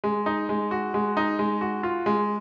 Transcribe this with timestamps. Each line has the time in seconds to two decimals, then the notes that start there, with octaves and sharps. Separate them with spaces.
0.04 G#3
0.26 D#4
0.49 G#3
0.71 F#4
0.94 G#3
1.17 D#4
1.39 G#3
1.61 F#4
1.83 F4
2.06 G#3